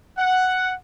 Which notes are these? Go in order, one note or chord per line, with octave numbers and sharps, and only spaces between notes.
F#5